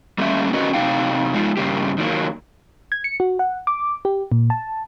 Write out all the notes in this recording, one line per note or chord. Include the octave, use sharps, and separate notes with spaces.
G3 A3 A#3 C#4 E5
C#4 F#4 A#4 B4 D#5
C3 E3 F#3 D#4 F5 G5
G#3 D#4 F4
G2 C#3 A#3 G4
D#3 F#3 A#3
G#6
C#7
F#4
F#5
D6
G4
A#2
A5